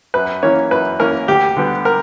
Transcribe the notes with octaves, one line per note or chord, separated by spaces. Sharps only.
F#2 B4
E3 A#3 C#4 C#5
F#2 B4
E3 A#3 C#4 A#4
D2 G4
D3 G3 B3
A#4